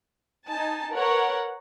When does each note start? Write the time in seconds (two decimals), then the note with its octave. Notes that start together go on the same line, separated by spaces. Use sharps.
0.49 D#4 G#5 A5
0.93 A#4 B4 C#5 F#5